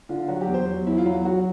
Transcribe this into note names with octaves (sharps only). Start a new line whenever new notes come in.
D3 F4
F#3 F#4
G4
E2
C5
F#3
E2 E4
F4
F#3 E4
F#3 F#4